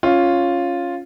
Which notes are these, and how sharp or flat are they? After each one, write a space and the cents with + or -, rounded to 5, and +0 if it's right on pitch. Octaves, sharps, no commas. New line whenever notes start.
C#4 +0 F4 +0